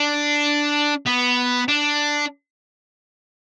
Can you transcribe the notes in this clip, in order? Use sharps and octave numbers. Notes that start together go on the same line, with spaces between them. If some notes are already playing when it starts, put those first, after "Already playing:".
Already playing: D4
B3
D4